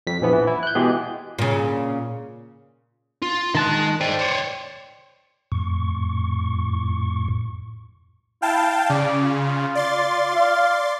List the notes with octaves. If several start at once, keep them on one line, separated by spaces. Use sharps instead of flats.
F2 B6
A#1 E3 F3 B3
E3
E4
F#6 G6
B2 E3 G#3 B3 G4 G#4
A#2 C#3
F4
D#3 G#3 A5 C6 F#6
C5 D5 D#5 G5
C5 C#5
F2 A2 C#6
E4 F5 G5 A5
C#3 D5
F4
D5 C6 A6
F5